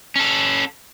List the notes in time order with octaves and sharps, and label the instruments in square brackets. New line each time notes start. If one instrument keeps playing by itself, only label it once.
[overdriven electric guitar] C#4 A4